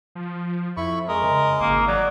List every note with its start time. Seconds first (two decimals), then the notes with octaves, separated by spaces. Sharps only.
0.15 F3
0.77 F2 E4 B5 C#6
1.08 G#3 A#4 D#5
1.24 C#3
1.60 G#1 A#3
1.88 F#3 D5